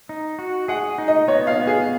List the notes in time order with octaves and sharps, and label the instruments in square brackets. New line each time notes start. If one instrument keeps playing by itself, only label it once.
[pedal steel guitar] D#4
F#4
[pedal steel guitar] G#4 [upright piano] F#5
[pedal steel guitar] D#4
[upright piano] D#5
[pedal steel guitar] B3 [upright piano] C#5
[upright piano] F5
[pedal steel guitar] B3
[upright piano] G#4